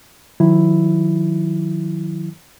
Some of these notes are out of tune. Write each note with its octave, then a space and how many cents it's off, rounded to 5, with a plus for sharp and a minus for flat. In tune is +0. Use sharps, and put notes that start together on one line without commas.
D#3 +0 F#3 -35 E4 +0